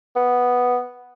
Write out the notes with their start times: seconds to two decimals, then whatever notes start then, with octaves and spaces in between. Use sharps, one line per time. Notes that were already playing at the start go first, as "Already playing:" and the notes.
0.16 B3